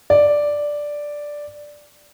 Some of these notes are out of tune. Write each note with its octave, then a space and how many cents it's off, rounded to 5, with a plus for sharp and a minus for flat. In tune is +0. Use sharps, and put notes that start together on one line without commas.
D5 +0